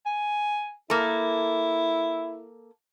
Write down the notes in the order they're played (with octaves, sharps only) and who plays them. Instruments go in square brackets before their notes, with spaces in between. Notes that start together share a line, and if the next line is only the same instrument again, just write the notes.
[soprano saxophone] G#5
[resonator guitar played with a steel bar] A#3 A4 [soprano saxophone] E4